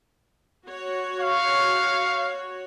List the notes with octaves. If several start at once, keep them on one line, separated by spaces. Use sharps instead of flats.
F#4 C#5
F5 C#6